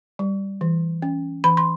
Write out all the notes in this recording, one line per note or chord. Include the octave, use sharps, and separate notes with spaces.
G3
E3
C#4
E3 B5
C6